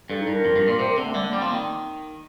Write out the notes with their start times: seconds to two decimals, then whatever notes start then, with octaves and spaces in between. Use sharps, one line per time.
0.10 G2 A4
0.21 D#4
0.27 G2
0.33 A#4
0.45 F2
0.56 G2
0.68 A#2 A#4
0.80 C3 C5
0.88 A#4
0.98 D3 C4
1.06 A3
1.15 D3 G3
1.27 A#3
1.33 G3
1.38 F3 C4
1.50 D#3 A#3